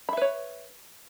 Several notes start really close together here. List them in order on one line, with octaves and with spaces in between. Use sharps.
B5 E5 B4 C#5